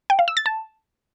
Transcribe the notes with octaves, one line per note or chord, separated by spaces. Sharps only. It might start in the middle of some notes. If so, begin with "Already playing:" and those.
G5
F5
E6
A6
A5